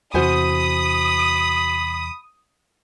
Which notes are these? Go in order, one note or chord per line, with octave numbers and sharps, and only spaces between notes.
E2 C3 F#4 C5 G#5 B5 D#6